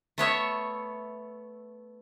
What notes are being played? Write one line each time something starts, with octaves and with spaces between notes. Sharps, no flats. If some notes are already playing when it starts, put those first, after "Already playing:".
A3 B3 C#5 E5